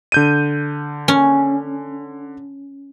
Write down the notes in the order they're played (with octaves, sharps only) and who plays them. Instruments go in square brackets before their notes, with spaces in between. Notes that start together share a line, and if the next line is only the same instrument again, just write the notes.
[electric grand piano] D3 G6 D#7
[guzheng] C#4